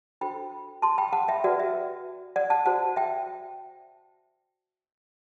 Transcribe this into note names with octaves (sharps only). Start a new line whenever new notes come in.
D4 F#4 A4 C5 G5 B5
A5 C6
G5 B5
F#5 A5
E5 G5
F#4 B4 D5 F#5
E5
D5 F#5
F#5 A5
F#4 C5 F#5 A5
E5 G5